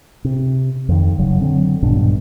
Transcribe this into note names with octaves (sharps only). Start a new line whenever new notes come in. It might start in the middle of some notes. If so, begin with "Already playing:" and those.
C3
F2 D#3
F#1 C#3 F#3
D3 F#3 C4 D4
A#1 G2 B2 D4